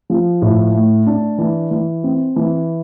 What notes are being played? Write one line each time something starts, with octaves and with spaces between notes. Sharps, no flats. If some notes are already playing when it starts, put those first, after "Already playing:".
F3
A2
A3
D4
E3
E3
C4
E3